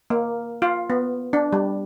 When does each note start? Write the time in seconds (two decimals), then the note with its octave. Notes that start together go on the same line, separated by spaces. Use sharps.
0.10 A#3
0.62 F4
0.90 B3
1.33 D4
1.53 G3